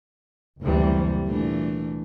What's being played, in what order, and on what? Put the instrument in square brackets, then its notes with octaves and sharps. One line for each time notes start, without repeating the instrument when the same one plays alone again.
[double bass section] F#1 D2 E3 [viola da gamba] C3 G3
[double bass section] A#2 [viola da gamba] E3 A3 D4